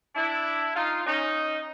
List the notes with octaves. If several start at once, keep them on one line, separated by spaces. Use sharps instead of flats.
D4 E4
D#4 F4
C#4 D#4